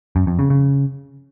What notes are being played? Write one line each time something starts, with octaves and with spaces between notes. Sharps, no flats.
F#2
F2
C#3
C#3